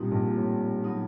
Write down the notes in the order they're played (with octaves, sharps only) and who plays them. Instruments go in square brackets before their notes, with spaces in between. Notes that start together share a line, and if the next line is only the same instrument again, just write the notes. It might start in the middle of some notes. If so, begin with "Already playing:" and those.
Already playing: [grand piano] A#1 A#2 [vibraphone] G3 C4 D#4 G4
[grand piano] A#1 A#2
A#2
A2
[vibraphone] F#3 B3 D#4